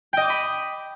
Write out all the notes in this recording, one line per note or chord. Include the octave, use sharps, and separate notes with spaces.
D#5 G5 B5 D6 D#6